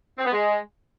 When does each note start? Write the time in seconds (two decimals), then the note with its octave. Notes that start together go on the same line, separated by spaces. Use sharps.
0.18 C4
0.25 B3
0.32 G#3